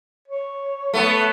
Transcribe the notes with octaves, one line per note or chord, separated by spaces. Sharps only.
C#5
A3 B3